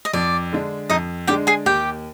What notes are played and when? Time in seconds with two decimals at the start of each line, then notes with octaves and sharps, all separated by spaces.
0.05 D#5
0.13 F2 D5
0.52 D3 G#3 D4
0.90 F2 D#4 D#5
1.27 D3 G#3 D4 G4 G5
1.47 G#4 G#5
1.66 D#2 G4 G5